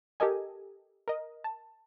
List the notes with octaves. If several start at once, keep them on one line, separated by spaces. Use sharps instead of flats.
G4 A4 A#4 D#5 G#5
A#4 D#5
A5